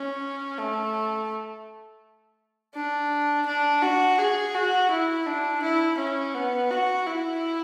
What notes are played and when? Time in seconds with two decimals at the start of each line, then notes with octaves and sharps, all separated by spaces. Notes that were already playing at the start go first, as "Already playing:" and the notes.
Already playing: C#4
0.58 A3
2.74 D4
3.46 D4
3.82 F#4
4.19 G#4
4.55 F#4
4.91 E4
5.27 D4
5.63 E4
5.98 C#4
6.35 B3
6.71 F#4
7.07 E4